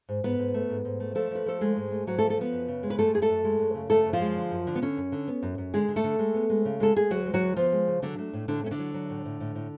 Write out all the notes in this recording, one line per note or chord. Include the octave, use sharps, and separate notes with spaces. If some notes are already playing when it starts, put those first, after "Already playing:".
G#2
G#2 B3 B4
G#2
A3
G#2
G#2
A3
F3 A3 A4
F3 B4
F3 A4
G#3 A3 G#4
G#2
A3
G#2 F#3 F#4
A3 A4
F3
A3 A4
F3 B3 B4
F#2
C#3
G#3
B4
F#2 A3 A4
F#2 G#4
A3 A4
F#2
G#3
F#2
C#3
F#2 A3 A4
F#2
F3 F4
G#3
D3
F#2
D3
B3
D3 C#4
F#2
D3
B3
F#2
F#2
D3 G#3 G#4
D3
A3 A4
D3
G#3
B3
G#3
C#3
G#3 A4
G#3 G#4
D2 F#3 F#4
G#3
F#3 F#4
D2
F3 B3 F4
G#3
C#3
D3 F#3 D4
A3
A2
A2 D3 D4
A3 C#4
D3 D4
F#3
F#3
A2
A2
A2
A2